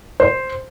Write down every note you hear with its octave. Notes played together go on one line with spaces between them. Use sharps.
C5